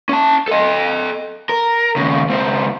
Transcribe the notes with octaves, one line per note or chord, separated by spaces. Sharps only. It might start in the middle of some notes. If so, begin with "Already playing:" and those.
C#4 A5
A4 D#5
A#4
D#2 C#3
C#2 C4